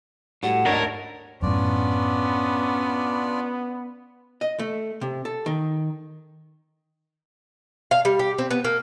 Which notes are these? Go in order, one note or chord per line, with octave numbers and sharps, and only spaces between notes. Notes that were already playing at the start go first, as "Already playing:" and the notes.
A2 G3 F#4 F#5
G#1 D2 D4 E4 A#4 C#5 D#5
F#2 A2 B3 C#4 D4 F4 D5
D#5
A3
C3
A4
D#3
F5
G3
G4
C4
B3
A#3